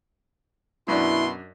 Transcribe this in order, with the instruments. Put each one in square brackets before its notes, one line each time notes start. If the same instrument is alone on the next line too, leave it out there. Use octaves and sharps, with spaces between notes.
[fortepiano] F#2 D4 [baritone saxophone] B2 [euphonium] E4 [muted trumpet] C6